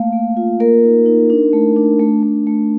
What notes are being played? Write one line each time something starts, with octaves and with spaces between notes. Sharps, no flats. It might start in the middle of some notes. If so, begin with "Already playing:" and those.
Already playing: A3 A#3 F5
A#3
F4
A#3 A#4
D#4
D#4
D4
A3
D4
A3
A3
A3